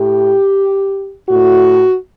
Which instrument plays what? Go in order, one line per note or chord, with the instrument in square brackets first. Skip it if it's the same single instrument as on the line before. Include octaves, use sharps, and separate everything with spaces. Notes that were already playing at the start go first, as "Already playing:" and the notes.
Already playing: [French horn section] A2 G4
A2 F#4